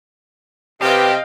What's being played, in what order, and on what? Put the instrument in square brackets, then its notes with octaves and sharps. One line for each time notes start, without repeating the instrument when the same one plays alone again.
[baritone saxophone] C3 [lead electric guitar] G4 [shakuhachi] B4 [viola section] D#5 F5 G5